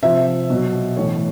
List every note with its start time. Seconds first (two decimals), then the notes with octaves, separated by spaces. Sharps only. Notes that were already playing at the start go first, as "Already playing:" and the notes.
0.03 C3 F3 E5
0.50 B2 F#3
0.97 A2 E3 C#5